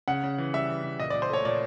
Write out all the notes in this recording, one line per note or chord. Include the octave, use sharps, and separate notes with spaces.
C#3 F#5
C#3
E3
G3 E5
E3
C#3
A#2 D#5
A#2 D5
C5
A3 C#5
A#2 D5